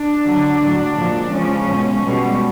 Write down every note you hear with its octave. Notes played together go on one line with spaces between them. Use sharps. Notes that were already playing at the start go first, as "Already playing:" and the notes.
Already playing: D4
D3 F#3
A2 F#3
A#2 F3 G#3
C#3 F3 G#3 C#4
B2 G#3
B2 G3 G#3